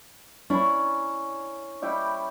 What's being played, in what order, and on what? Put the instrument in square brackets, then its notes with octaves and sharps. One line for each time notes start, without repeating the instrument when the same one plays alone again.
[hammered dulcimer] C#4 [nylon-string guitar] D4 E4
[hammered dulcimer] G3 E4 G5